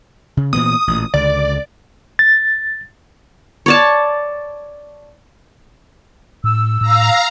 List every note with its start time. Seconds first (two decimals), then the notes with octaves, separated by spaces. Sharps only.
0.37 C#3
0.53 A#2 E3 B3 D#6
0.87 A1 A#2
1.14 C#2 D3 D5
2.19 A6
3.66 C#5 D5 A5
6.44 A2 E6
6.81 A2 F5 A#5